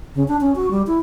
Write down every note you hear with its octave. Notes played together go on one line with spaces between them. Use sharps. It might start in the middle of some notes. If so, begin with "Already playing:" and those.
C#3
D4
C#4
F#4
G3
E4